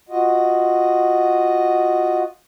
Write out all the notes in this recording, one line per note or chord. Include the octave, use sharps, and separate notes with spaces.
F4 F#4 D#5